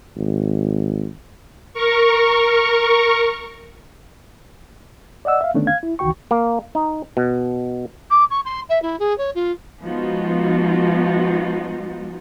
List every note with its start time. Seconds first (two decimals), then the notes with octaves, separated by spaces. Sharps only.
0.16 G#1
1.73 A#4 C#6
5.25 D5 D#5 F#5 E6
5.41 E5 F5
5.54 D3 D#3 A3 B3 C#4 D4
5.67 F5 G#6
5.83 E4
5.99 C2 D#3 E3 F#4 G5 C#6
6.31 A#3
6.75 D#4
7.17 B2
8.10 D6
8.30 C#6
8.45 C6
8.69 E5
8.82 E4
8.99 G#4
9.18 C#5
9.35 F4
9.81 F3 G#3 B3 D#4 F4 F#4